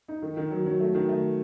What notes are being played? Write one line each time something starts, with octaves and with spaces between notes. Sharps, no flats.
D#4
D#3
D#3
F#3
F#3
A3
D#3
A3